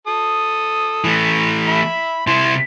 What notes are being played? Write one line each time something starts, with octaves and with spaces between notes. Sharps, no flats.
A4 D#6
E3 A3
E5 B5
C3 E4 C6